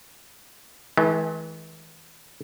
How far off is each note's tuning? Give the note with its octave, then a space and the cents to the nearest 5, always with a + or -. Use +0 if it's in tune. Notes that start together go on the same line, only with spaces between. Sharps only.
E3 -35 G#3 +40